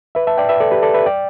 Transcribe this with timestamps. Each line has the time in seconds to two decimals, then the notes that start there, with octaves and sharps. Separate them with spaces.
0.15 B4 E5
0.27 E5 A5
0.38 D5 G5
0.49 B4 E5
0.60 A4 D5
0.71 G4 B4
0.83 A4 D5
0.94 B4 E5
1.06 D5 G5